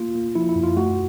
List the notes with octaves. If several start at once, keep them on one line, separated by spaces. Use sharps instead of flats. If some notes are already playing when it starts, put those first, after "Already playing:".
Already playing: A#3 F4
A#3
F3 E4
E4
F#2
F4
A3 F#4